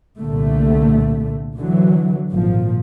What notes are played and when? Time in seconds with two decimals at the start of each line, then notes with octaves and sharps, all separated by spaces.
0.19 C2 A#2 D3 A3
1.56 D3 E3 F#3
2.29 G#1 A#2 F3